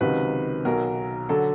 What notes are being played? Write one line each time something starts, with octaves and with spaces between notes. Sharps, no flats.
C#2 C3 D#3 F#3 B4
B1 B2 F#3 A#4
D3 F#3 A4